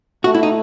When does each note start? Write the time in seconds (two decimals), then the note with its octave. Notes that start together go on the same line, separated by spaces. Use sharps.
0.24 A3 F#4
0.34 E4
0.43 D#4